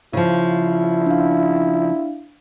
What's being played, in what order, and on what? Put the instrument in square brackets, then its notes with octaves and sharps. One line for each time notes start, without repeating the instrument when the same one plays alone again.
[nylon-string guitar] C#3 F3 [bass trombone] E4
[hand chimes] D4 F5